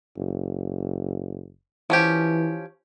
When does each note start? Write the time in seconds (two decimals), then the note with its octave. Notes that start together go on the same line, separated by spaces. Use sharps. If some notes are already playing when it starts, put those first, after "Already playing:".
0.17 F#1
1.90 E3 F3 C#4 G4